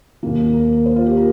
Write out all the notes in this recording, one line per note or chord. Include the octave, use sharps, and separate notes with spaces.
D#2 D#3 A#3
A#4
C5
F4
G4
A#4